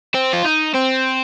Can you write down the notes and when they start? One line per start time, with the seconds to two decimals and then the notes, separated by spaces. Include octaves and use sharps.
0.14 C4
0.33 F4
0.45 D#4
0.75 C4